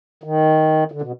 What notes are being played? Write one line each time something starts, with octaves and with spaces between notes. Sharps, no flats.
D#3
D3
B2